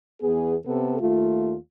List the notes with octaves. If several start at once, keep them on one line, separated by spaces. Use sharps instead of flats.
E2 B3 G#4
C3 B3 A4
D#2 A3 F4